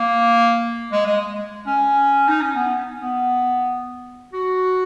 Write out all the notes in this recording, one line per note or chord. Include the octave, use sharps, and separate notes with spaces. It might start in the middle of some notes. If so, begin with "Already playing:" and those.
Already playing: A#3
G#3
G#3
C#4
D#4
C#4
B3
B3
F#4